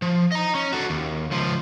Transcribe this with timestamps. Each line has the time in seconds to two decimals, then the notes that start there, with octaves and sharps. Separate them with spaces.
0.02 F3
0.32 D#5 A#5
0.55 C#4
0.73 F#4 A4
0.90 D#2
1.31 C#2 F3